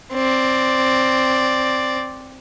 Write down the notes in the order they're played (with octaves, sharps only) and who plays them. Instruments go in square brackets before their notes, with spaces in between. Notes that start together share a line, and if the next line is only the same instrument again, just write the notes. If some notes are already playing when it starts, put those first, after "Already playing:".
[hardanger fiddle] C4 D5